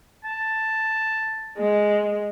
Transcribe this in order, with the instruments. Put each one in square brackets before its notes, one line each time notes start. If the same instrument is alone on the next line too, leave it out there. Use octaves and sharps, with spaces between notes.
[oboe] A5
[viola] G#3